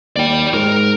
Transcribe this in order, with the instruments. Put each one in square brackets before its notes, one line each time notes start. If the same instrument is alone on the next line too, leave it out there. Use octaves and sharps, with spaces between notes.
[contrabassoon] D#2 [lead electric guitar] D5 G5
[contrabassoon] G#2 [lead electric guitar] A#4